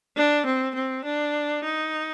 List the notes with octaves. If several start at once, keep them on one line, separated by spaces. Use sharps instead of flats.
D4
C4
C4
D4
D#4